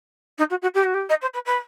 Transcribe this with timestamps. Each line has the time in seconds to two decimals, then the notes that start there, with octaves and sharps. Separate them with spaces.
0.38 D#4
0.50 F#4
0.62 F#4
0.74 G4
0.84 F#4
0.94 G4
1.09 D#5
1.21 C5
1.33 B4
1.45 B4